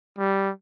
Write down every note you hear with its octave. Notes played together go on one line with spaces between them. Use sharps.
G3